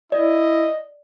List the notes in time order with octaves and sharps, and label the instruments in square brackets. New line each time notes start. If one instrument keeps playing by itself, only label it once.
[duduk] E4 [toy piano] D5 [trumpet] D#5